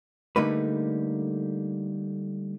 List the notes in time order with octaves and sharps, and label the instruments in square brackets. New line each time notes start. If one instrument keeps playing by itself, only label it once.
[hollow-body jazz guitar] D3 G3 A3 A#3 D#4 B4